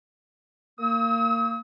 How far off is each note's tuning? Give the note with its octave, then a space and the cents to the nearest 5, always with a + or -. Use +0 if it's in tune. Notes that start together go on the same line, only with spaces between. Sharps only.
A#3 -25 D#6 +45